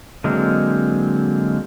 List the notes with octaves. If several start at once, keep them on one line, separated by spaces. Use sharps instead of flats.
D3 F#3 G#3 A#3 C4